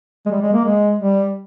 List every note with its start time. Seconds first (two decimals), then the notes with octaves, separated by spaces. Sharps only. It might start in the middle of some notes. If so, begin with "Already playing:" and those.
0.26 G#3
0.31 G3
0.42 G#3
0.53 A#3
0.65 G#3
0.99 G3